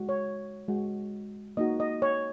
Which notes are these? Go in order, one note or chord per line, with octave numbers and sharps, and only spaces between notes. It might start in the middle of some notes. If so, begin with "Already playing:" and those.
Already playing: G#3 F#4
C#5
G#3 F#4
A#3 D#4 F#4 D#5
D#5
C#5